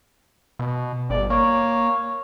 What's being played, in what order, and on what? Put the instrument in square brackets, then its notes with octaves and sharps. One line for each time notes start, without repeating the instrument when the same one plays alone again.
[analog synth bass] B2
[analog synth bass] G1 [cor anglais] D5
[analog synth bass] A#3 [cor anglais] C#5